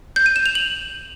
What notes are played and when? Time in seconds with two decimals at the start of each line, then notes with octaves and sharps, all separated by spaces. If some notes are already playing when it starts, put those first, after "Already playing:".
0.16 G6
0.26 D#7
0.36 E7
0.46 F7
0.55 F#7